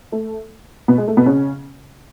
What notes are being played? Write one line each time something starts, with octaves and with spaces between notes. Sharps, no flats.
A3
B2 B3
G#3
A3
B2 B3
C#3 C#4